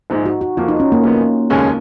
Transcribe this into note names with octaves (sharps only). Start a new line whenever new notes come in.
A#1 G#2 F3 G#3 D#4
F#4
F#4
F1 F2 F3 A#3 F4
D#4
C#4
A#3
F#2 C#3 F3 A#3 B3
F1 D#2 C#3 G#3 C#4